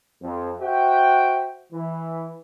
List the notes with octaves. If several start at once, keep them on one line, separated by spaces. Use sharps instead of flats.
F2
F#4 C5 E5 F#5 G5
E3